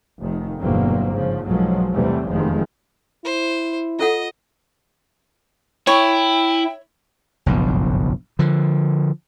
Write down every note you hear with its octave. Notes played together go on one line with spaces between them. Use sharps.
F1 D#3
G1 E2 B2 F#3 A#3 C4
G#2 C#3 F3
B1 F3 F#3 G#3
E2 C3 E3 G3 A3
F1 E2 D#3 F3 G#3
E4 C5
F4 A4 D#5 F#5
E4 C#5 G5
F#1 B1 G2 F3
D3 F3